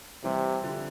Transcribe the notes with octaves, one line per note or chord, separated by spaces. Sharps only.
C3 E3 G3
D3 F3